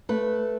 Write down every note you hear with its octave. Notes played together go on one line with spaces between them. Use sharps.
A3 B4